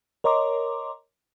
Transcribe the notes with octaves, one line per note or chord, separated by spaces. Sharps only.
A#4 C#5 D#5 A#5 C6 D6